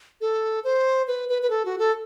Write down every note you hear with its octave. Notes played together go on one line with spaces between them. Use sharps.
A4
C5
B4
B4
B4
A4
F#4
A4